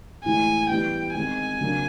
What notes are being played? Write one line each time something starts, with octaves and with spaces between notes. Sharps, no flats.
A2 E3 G#3 G#5
E3 G3 B3 G5
D#3 G#3 C4 G#5
C#3 F#3 A#3 D4